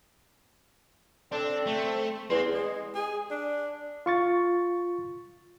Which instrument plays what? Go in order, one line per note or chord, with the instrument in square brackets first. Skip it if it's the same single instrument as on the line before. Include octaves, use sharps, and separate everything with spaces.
[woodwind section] C4 A4 [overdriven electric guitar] D4
[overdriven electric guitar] A3
[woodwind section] E2 [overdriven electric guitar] C4
[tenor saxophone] G#3
G#4
D4
[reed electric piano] F4 C#6 A6